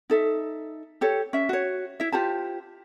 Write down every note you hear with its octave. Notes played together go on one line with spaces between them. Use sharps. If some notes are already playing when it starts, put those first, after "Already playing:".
D#4 A4 E5
G4 A4 C#5
C#4 E5
F#4 C#5
E4 E5
F4 G4 C5 A5